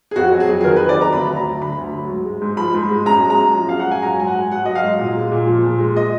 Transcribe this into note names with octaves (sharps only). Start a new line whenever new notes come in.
G#4
F2 F#4
F#3
G#4
F2
G#4
D#3 A#4
B4
F2
D5
F#3
A#5
D2 B5
F#3
A#5
D2
D3 B5
D2
F#3
G#2
G#3
G#2
F3 B5
G#2
G#3
F#2 A#5
G#3
A#5
F#2
F3
F#2 F5
F#5
G#3
G#5
F#3 A#5
G#2 G#5
F#5
G#2
F#3 F#5
F#3 D#5
F5
G#2
A#2
G#3
A#2
F3
A#2
G#3
D#5